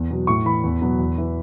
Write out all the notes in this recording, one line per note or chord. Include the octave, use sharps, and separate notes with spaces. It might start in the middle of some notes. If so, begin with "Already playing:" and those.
Already playing: E2
B2 F#3
A2 C#6
E3 B5
E2
B2 F#3
E2
E3